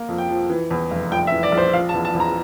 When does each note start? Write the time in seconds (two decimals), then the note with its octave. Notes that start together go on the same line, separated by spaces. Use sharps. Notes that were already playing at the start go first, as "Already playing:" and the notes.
Already playing: A#3
0.08 F2
0.18 G5
0.29 F3
0.50 E3
0.71 E2
0.91 F1
1.11 A#1 G5
1.27 E5
1.32 E3
1.43 D5
1.52 A#1
1.58 C5
1.73 F3 F5
1.89 A5
1.94 E2
2.05 A5
2.14 E2
2.20 A#5